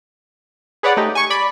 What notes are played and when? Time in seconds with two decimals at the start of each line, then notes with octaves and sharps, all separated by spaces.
0.83 G#4 B4 C#5 D5 F#5
0.97 A3 D#4 G4
1.15 G#5 C#6
1.30 D5 B5